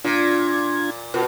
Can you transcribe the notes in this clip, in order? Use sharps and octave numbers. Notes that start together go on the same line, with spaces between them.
A#2 D4 F4 G#6
B2 F4 A#4